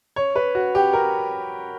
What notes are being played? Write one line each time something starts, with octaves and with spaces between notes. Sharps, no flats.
C#5
B4
F#4
G4
A#4